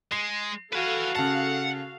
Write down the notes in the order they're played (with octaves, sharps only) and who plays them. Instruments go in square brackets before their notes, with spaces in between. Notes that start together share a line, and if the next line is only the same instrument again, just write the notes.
[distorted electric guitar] G#3 [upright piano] C7
[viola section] F#4 A4 F5 [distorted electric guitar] B4 G#5
[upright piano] C#3 A5 [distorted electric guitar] F#5